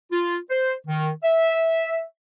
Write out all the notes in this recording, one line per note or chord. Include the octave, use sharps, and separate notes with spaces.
F4
C5
D#3
E5